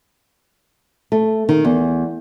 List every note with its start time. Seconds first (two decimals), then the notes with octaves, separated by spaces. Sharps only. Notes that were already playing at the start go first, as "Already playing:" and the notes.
1.12 A3
1.49 D#3
1.65 E2